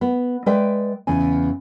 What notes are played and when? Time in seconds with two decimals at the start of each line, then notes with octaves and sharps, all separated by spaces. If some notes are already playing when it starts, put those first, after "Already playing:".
0.01 B3
0.46 G#3 B4 D5 E5 G5
1.07 E2 C#3 G#5